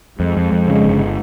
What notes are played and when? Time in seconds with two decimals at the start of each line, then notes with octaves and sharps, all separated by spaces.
0.20 F2 G#3
0.37 F2
0.52 F2
0.68 C#3 G#3
0.84 G1